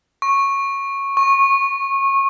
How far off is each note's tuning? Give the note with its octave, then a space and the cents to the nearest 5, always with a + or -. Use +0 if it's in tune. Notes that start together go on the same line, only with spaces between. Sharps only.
C#6 -10
C#6 -25